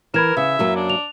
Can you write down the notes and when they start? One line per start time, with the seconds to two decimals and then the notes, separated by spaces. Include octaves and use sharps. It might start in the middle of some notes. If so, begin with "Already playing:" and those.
0.14 E3 A#4 B5 G#6 E7
0.37 C#3 E5
0.59 F#2 F#3 A#3
0.76 D4
0.90 F7